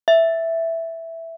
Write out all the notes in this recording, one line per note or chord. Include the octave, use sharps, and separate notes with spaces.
E5